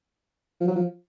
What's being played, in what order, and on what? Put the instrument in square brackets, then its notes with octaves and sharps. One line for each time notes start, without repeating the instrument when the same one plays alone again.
[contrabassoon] F3
F#3
F3